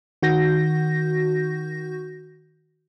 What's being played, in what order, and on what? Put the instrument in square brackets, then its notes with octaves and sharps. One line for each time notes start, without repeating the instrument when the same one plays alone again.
[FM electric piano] D#3 F#4 G6 A#6